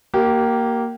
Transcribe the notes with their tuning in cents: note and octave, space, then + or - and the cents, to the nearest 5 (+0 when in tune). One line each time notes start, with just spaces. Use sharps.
A#3 +0 G4 -25